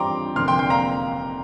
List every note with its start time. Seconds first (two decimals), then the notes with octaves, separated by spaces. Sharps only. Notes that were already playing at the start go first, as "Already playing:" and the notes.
Already playing: G2 G3 C4 F4 G5 A#5 C6 D6
0.36 F1 F2 D3 A#3 C6 F6
0.48 G5 C6
0.59 G5 C6
0.70 F5 A#5